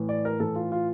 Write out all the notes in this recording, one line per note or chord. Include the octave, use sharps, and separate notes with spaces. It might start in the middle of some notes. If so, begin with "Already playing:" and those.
Already playing: A2 E3
D5
A#4
A2 E3 A4
F4
F4